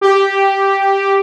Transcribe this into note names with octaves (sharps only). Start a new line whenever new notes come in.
G4